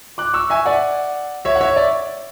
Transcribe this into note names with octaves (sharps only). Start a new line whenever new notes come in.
D6 F#6
C#6 E6
E5 G#5
D5 F#5
C#5 E5
F#5
C#5 E5
D5